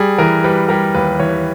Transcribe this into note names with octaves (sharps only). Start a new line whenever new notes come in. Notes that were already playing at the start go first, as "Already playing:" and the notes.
Already playing: G3 G#4
E3 A#4
G3 B4
G3 A#4
D#2 B4
E3 C#5